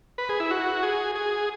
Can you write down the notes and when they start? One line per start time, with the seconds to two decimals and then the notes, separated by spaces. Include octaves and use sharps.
0.18 B4
0.29 G#4
0.40 E4
0.50 F#4
0.83 G#4
1.15 G#4